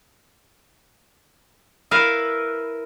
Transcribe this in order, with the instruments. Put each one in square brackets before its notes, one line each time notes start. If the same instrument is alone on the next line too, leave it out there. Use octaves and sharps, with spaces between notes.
[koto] E4 A#4 B4 E5 F5